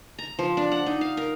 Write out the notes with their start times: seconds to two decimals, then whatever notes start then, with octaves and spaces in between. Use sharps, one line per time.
0.19 A#5
0.39 F3
0.57 D4
0.72 F#5
0.86 D#4
1.01 F5
1.17 A#4